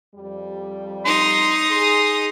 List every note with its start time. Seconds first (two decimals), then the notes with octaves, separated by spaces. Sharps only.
0.15 F2 G3
1.05 D#4 C6 D#6
1.71 G#4 C6